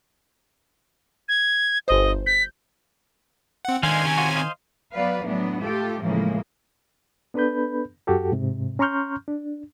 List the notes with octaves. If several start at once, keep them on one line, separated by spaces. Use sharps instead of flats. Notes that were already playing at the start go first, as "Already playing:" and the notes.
G#6
G1 C5 D#5
G6 B6
C4 F#5
D3 D#3 G#3 C5 F5 G#5 G#6
C3 C#4
F4 F#4
C5 D#5 F5
F#3 B3 B4 D5 F5
A2 E3 F#3 B3 D4
A3 F4 G4 A4
A2 C#3 E3 F3 G#3 A#3
B3 D4 A4 B4 B5 G6
F#2 F#4 G4 A4
G#2 C3
C#4 A#5 C6 C#6 F6 G6
D4